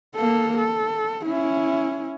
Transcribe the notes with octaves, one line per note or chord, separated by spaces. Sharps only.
A#3 A4
A4
C#4 E4